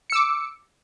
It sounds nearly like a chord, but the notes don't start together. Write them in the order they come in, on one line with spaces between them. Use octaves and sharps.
C#7 E6 D6